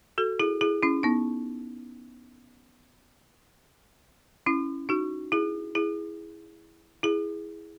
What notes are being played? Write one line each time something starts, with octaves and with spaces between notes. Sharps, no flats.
F#4 A4
E4 G#4
E4 G#4
C#4 E4
B3 D#4
C#4 E4
D#4 F#4
E4 G#4
E4 G#4
E4 G#4